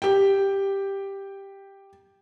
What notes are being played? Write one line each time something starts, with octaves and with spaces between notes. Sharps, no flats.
G4 G5